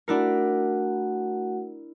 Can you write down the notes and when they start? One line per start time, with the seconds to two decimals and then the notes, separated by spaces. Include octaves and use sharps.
0.08 A3 D4 E4 F#4 A#4 F#5